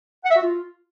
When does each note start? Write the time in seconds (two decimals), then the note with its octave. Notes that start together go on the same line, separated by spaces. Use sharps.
0.24 F#5
0.30 E5
0.36 F#4
0.42 F4